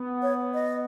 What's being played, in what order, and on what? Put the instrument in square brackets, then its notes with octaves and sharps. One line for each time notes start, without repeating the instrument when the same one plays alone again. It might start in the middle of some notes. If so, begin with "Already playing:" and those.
Already playing: [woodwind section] B3
[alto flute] C#5
D#5